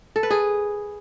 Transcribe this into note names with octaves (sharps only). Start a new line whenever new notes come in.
A4
B4
G#4